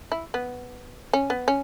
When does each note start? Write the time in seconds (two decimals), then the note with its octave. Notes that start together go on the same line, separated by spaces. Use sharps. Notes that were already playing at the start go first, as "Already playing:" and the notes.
0.12 E4
0.34 B3
1.13 C#4
1.30 B3
1.48 C#4